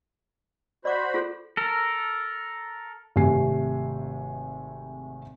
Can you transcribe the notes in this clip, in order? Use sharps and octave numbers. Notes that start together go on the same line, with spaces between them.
F#4 C5 D5 B5 D6
F4 G#4 A4
A4 A#4
G#1 C3 A3 G4 G#5 C7